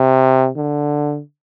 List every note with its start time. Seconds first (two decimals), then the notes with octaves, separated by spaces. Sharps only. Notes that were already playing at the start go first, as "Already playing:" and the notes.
Already playing: C3
0.56 D3